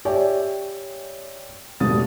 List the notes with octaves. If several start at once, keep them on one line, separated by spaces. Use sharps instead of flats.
G4 C#5 D5 E5 G5 G#5
E1 A2 G3 D#6 A6